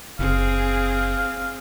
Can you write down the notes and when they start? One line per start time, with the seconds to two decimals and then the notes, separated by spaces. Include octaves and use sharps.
0.19 F#1 C4 G#4 F5